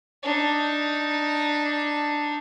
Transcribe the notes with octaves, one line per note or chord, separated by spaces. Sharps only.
D4 D#4